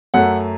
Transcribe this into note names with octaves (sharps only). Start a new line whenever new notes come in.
F#2 F#3 A3 F#5